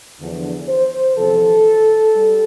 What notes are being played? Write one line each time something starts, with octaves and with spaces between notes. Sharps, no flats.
E2 D3 F3
C5
E2 C3 F3 A4
G3